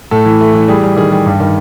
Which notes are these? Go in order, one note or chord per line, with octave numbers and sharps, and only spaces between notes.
A2 A4
E3
A3
E3
G3 G#4
G3
D#3 G#4
G3
G2
D#3